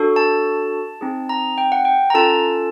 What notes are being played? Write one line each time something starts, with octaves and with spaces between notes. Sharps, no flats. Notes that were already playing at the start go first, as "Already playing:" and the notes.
Already playing: D4 F#4 A4
A5
C4 D#4 G#4
A#5
G5
F#5
G5
A#5
C#4 F4 A4 A5